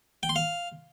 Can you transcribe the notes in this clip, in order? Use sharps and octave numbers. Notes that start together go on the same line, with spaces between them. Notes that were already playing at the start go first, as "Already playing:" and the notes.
G5
C6
F5